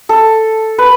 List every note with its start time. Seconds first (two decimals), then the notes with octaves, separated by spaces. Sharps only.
0.09 A4
0.78 B4